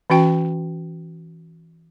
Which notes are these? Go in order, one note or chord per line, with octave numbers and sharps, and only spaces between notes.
E3 C#4 F#4 G5